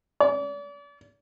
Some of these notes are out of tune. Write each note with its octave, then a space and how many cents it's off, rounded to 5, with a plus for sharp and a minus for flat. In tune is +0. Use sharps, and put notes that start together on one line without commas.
D5 -40